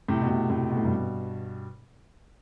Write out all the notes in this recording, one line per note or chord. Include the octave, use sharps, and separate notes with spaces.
A2 C3
B2
A2 C3
A2 C3
B2
A2
G2 B2